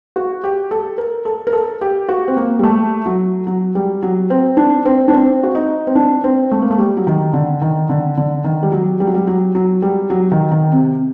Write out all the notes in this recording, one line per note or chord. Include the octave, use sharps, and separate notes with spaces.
F#4
G4
A4
A#4
A4
A#4
A4
G4
F#4
C4
A#3
G3
A3
F#3
F#3
G3
F#3
C4
D4
C4
D4
C4
F#4
D#4
C4
D4
C4
A3
A#3
A3
G3
F#3
D#3
D3
D#3
D3
D3
D#3
G3
F#3
G3
F#3
G3
F#3
F#3
G3
F#3
D#3
D#3
C3